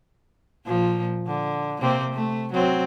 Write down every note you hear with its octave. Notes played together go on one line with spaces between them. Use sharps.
A#2 F3
D3
C3 A#3 C4
A3
F#3 C4